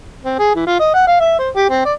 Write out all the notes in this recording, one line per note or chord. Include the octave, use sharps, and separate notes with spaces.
C4
G#4
E3
F4
D#5
F#5
F5
E5
C5
G4
C4
D5